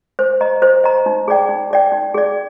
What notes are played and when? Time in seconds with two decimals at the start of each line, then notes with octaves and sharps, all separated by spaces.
0.19 C5
0.41 D#5 A#5
0.62 C5
0.84 D#5 A#5
1.06 D#4
1.28 G#4 D5 G5
1.49 D#4
1.71 G#4 D5 G5
1.92 D#4
2.14 G#4 D5